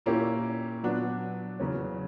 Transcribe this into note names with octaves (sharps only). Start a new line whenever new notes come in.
A#2 A#3 C#4 E4 G4
A#2 F#3 B3 D4 F#4
E2 C#3 F#3 C#4